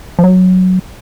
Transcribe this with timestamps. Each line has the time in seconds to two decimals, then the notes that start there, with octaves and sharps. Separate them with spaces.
0.19 F3
0.24 F#3